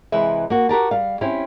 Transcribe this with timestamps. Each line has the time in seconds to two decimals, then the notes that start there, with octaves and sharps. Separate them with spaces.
0.12 C3 E3 G#3 B4 E5
0.50 A#3 F#4
0.69 F#4 G4 A#4 A5
0.91 G3 F5
1.21 C4 C#4 E4 G4